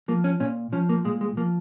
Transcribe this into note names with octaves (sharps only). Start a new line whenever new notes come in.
F3 A#3
C#4
A#2 C#4
F3 C#4
A#3
A#2 G#3
G#3
F3 A#3